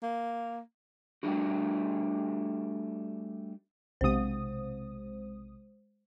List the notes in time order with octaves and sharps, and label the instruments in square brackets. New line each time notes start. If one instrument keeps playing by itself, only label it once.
[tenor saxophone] A#3
[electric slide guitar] G3 A3 D4 F#4
[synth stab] B1 C3 D#6 [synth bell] G#3 C5